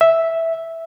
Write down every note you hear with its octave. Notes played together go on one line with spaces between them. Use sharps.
E5